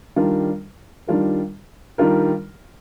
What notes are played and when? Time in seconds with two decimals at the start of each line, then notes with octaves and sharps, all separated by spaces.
0.16 D#3 G3 D4 F4 A#4
1.07 D#3 G3 D4 F4 A#4
1.98 D#3 G3 D4 F4 A#4